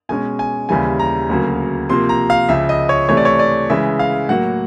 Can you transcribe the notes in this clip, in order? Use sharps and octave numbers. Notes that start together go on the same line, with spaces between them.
B2 G#3 C#4 G#5
G#5
D#2 C#3 E3 G3 G#5
A#5
D2 C#3 F#3 A#3
C3 F3 A#3 C6
A#5
F5
C#2 C#3 F3 E5
D#5
C#5
C3 E3 A3 C#5
D5
C#5
D5
C#3 E3 G#3 E5
F5
A2 F#3 A#3 F#5